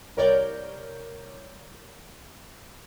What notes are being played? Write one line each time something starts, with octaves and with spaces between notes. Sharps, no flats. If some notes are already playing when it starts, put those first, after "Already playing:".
C2 A#4 C#5 D5 G6